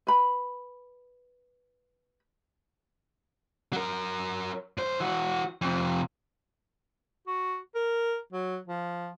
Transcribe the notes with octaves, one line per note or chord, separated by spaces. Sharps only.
B4 B5
F#3 A#4
F#2 C5
E3 F#4
F2 C3
F#4
A#4
F#3
F3